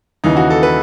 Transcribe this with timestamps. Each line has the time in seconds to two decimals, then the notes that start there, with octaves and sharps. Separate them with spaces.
0.24 D#2 C#3 E3 D#4
0.36 F#4
0.50 A4
0.63 B4